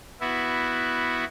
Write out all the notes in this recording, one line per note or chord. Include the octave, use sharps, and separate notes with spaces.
B3 E4 F#4